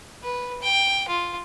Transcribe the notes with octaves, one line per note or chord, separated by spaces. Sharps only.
B4
G5
F4